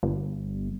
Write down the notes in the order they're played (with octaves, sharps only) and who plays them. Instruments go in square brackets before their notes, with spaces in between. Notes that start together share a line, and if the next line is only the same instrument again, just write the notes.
[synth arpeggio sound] G1